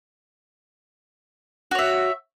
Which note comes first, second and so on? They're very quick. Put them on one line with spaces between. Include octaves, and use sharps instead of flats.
F#4 C#5 E5